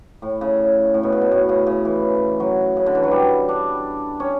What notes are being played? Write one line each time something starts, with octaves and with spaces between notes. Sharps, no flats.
A2
C#3
A2
B2
C#3
B2
A2
C#3
C#3
E3
F#3
C#3
D3
E3
F#3
G3
D4
C#4